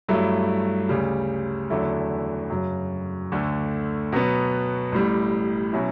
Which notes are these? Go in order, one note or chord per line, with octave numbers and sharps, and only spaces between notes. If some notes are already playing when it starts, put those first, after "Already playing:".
G2 F#3 A3 E4
D2 C#3 G3
E2 D3 F#3 A3 E4
F#2 C#3 F#3
D2 D3 A3
B2 F#3 B3
A1 A2 G3
B2 F#3 C#4 E4